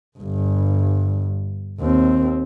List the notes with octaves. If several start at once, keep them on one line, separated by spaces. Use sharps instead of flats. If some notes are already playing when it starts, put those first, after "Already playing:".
G1 G2
D#2 C4